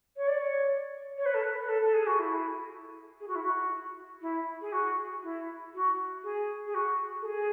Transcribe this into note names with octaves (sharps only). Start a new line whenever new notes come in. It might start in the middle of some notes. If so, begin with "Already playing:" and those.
C#5
D5
C#5
C#5
B4
A4
B4
B4
A4
A4
G#4
F#4
E4
G#4
F#4
E4
F#4
E4
G#4
F#4
E4
F#4
G#4
G#4
F#4
A4
G#4